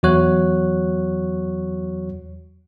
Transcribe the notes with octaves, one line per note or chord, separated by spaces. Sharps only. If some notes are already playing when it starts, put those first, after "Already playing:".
E2 F#3 F#4 C#5 F#6